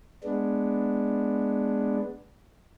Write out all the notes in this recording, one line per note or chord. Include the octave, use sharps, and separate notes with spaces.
G#3 B3 D4